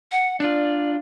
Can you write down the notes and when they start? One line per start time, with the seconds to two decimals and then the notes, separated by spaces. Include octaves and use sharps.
0.12 F#5
0.40 D4 F4 D5